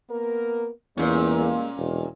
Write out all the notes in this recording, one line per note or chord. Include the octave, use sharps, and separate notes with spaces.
A#3 B3 A#4
E2 A#2 G3 G#3 A#3 C#4
E1